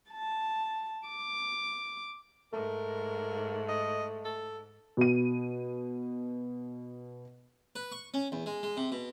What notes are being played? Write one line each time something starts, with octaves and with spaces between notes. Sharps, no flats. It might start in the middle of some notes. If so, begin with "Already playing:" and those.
A5
D6
G#2 A3 A#4
D#5
A4
B2 D#7
B4
C#6
C#4
E2
G#3
G#3
C3
B2